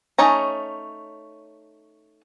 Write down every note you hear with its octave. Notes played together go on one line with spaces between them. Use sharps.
A3 C#4 D#4 C#5 A#5